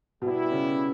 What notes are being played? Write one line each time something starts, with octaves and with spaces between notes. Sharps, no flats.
B2 G3 B3 E4
C#3